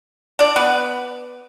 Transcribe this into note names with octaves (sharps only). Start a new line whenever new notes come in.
D4 D5
B3 B4